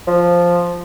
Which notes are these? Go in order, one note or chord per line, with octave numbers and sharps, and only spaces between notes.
F3